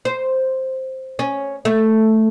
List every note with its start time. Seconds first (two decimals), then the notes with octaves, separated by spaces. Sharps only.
0.05 C5
1.19 C#4
1.65 A3